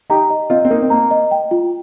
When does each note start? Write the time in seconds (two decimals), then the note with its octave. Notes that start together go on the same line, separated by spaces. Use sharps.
0.10 D#4 G4 A#5
0.30 D#5
0.50 C4 F4 D#5
0.65 C4
0.70 A#3 D#4 A#4
0.82 C4
0.90 A#3 A#5
1.11 D#5
1.31 G5
1.51 F4